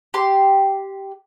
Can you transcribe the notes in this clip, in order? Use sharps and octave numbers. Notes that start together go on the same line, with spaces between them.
G4 C6